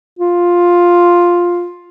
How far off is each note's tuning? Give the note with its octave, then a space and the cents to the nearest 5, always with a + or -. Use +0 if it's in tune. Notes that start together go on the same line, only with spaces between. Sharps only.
F4 +5